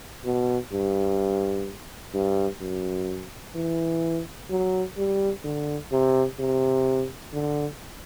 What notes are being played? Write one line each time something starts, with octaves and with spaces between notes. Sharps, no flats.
B2
G2
G2
F#2
E3
F#3
G3
D3
C3
C3
D3